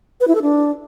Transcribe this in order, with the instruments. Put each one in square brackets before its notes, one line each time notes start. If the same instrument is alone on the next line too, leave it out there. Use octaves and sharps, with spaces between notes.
[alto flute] B4
E4
A4
D4